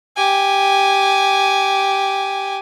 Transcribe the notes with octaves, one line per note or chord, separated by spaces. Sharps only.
G4 G#5